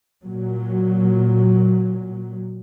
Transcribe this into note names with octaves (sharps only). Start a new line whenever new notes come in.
A#2 F#3